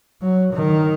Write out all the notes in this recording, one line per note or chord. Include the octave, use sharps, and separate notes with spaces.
F#3
D#3